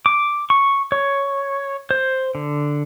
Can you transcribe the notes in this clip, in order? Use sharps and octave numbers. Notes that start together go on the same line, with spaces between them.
D6
C#6
C#5
C5
D3